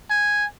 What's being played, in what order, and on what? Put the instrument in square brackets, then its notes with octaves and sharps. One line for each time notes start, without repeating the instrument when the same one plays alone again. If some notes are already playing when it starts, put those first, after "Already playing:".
[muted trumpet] G#5